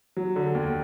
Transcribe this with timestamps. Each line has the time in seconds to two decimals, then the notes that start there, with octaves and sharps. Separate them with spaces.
0.17 F#3
0.36 D3
0.55 D#2